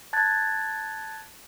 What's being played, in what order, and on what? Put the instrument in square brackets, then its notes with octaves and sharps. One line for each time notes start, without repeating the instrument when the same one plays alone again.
[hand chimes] A5 F#6 G#6 A6